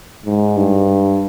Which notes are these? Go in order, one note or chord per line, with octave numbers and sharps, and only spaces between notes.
G#2
G2